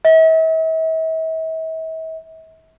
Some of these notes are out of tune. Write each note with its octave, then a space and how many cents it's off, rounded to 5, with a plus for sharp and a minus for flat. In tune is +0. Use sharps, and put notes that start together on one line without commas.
E5 -45